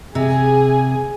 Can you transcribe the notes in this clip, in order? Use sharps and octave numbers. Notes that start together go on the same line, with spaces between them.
C3 G#4 G#5